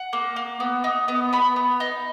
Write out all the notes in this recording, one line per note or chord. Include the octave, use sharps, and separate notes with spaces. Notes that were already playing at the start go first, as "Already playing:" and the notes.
Already playing: F#5
A#3
A#3
B3
D#4
B3
B3 B5
B3
D#4